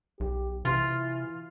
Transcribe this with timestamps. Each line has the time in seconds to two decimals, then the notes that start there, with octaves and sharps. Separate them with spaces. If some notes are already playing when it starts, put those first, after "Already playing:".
0.20 B1 G4
0.65 C3 E3 F4